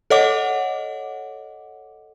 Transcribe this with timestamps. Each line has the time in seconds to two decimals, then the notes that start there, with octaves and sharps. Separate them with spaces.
0.10 A4 C#5 D#5 F#5 D6